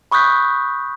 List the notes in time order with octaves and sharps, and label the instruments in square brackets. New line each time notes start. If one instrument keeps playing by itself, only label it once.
[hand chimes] B5 C#6 D#6 F#6 G6 B6